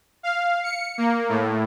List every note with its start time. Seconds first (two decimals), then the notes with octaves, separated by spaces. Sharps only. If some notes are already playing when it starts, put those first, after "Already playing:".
0.23 F5
0.64 C#7
0.98 A#3
1.29 A2